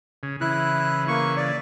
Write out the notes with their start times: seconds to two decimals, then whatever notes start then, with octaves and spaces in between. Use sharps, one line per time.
0.23 C#3
0.41 C#3 E3 E4 F#6
1.08 A#3 C#6
1.37 D5